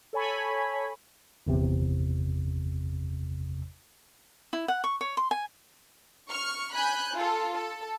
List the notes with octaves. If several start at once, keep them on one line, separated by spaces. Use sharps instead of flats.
A4 C#5 G#5 B5
G1 E2 C3
E4
F#5
C#6
C#5
C6
G#5
C#6 F6
G#5 B5 F#6 G6
F4 A4
A4